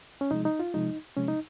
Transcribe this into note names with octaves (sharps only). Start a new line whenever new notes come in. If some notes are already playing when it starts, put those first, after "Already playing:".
C#4
C3 F3 G#3 D#4
D#4
F4
C3 F3 G#3 D#4
C3 F3 G#3 C#4
D#4